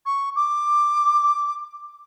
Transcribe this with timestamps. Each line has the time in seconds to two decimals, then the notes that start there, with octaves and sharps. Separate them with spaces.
0.06 C#6
0.36 D6